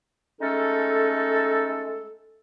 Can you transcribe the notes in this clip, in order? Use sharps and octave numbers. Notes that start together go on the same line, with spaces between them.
G#3 A3 C#4 D#4 A4